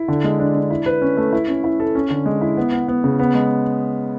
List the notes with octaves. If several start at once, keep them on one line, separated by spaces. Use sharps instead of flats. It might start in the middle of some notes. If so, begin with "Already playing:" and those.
Already playing: E4
D3
G#3
D4
D4
E4
B4
C#4
A3
E4
C#4
E4
A4
C#4
D3
G#3
E4
B3
B3
B3
C#3
B3
G#3